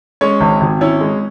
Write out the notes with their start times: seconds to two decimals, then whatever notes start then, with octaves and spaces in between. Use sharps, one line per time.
0.21 G#3 C#4 C#5
0.41 G#1
0.61 G#1
0.81 C#4 E4 C#5
1.01 G#3